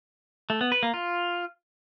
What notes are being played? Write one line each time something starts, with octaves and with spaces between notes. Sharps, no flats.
A3
B3
B4
A#3
F4